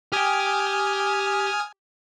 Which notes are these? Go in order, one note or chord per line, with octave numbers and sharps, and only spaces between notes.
G4 G5 G#5 D#6 F6